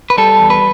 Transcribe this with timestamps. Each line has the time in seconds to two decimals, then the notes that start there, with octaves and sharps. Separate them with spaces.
0.10 B4
0.18 G3 A4
0.40 E2
0.50 B4